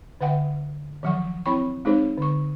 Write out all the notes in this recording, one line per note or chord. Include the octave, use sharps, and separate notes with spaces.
D3 B4 E5 F#5 G5
D#3 F3 F#3 F#5 C#6
C4 E4 C#5 G5 B5 C#6
G#3 C4 D#4 G#4 C5 C#5
D3 C#6